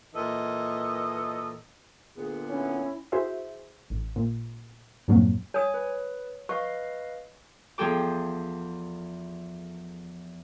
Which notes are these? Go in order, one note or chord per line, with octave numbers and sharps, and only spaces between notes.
A#2 E3 A4 D#5
A#2 D3 B3 G#4
C#4 E4
E4 F#4 G#4 C5 E5
A1
A#2
E2 G2 A#2 F#3 A#3 C4
C#5 G#5 D#6
B4
B4 D#5 F5 C#6
E2 F3 G#4 A4 G5 D6